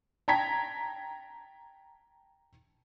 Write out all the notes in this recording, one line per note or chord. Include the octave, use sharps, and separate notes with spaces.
G5 A5 A#5 G#6 B6